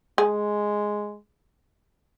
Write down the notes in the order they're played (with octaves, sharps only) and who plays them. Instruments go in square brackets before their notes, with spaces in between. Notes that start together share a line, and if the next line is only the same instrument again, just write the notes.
[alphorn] G#3 [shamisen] G#4